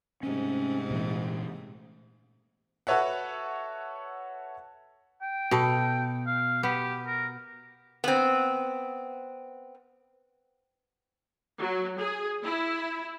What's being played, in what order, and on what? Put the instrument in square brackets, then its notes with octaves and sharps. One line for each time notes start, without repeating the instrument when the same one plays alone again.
[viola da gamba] G#2 C3 A3 [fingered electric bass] C#4
[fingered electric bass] A#2 E3
[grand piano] F#4 A4 B4 C#5 E5 F#5
[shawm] G5
[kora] B2 A4
[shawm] F5
[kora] B3 [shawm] G4
[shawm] A#4
[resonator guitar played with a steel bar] B3 C4
[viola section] F#3
G#4
E4